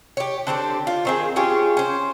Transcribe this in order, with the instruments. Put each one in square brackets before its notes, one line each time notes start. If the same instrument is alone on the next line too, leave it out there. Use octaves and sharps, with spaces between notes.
[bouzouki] G4 C#5
D3 C4 D4 G4
F4
D#3 C4 G#4
C#4 F4 G4 G#4
C#4 C5